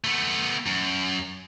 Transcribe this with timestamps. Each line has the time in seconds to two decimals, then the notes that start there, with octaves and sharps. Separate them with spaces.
0.04 A3 B3
0.66 F#2